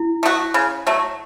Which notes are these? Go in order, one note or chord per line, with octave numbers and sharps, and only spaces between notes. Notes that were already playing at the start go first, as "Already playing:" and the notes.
Already playing: E4
A3 D4 F#4
C#3
F#3 A3